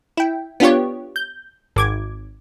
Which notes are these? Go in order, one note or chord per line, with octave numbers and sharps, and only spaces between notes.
E4 G5
B3 D4 F4 G4 C#5
G6
G#1 D6 G#6